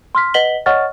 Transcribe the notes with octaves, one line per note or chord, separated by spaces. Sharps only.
C6 F6 B6
B4 D#5 F#5 B6 F#7 G7
C#5 D#5 F#5 C#6 F6 A6